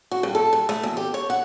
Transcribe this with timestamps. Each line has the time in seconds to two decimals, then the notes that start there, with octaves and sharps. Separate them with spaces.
0.11 F#4
0.23 G2
0.35 A4
0.53 G2
0.69 A3
0.84 E2
0.97 G4
1.14 C#5
1.30 F#5